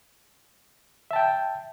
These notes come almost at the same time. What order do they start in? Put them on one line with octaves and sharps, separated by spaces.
E5 A5 G5